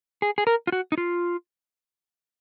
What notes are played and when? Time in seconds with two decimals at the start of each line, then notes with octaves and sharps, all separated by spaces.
0.22 G#4
0.38 G#4
0.47 A#4
0.67 F4
0.72 F#4
0.92 D#4
0.98 F4